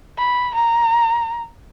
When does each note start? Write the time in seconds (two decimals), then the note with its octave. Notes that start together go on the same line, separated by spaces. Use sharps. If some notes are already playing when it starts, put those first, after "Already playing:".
0.18 B5
0.55 A#5